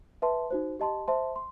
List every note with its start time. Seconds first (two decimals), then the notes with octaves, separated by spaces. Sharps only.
0.22 B4 E5 A5 C6
0.51 D#4 F#4 C5
0.79 G4 D#5 A5 C6
1.08 C5 E5 A5 C6
1.36 C6